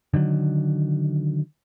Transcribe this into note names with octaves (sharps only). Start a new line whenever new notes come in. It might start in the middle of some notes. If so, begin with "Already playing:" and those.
D3 D#3 F#3